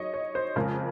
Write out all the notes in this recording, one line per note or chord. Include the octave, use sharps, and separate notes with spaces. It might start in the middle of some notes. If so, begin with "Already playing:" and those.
Already playing: D#3 F#3 C#5 D#5
C#5
C5
F2 C#3 G#3 A#4